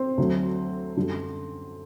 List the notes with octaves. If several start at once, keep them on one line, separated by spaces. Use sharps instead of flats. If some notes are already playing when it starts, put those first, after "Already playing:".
Already playing: C4
D2 D3 F#3
F#2 D3 G3